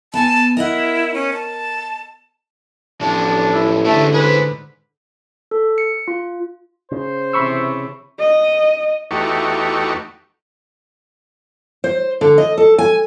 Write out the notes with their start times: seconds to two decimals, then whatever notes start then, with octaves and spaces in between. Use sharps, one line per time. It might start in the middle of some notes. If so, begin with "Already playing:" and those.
0.14 B3 G#5 A5
0.57 E4 A#4 D#5 F#5
1.14 C#4
1.33 A5
3.01 A1 A2 F3 D4
3.52 E4
3.85 G#2 D3 E3 A3 D4
4.14 G#4 B4 C5
5.51 A4
5.78 C#7
6.08 F4
6.92 C#3 C5
7.33 C3 E3 B5 C#6 E6
8.20 D#5
9.11 E2 A3 D#4 F#4 G4 C#6
11.84 C5
12.21 D3
12.38 D#5
12.57 A4
12.78 G#5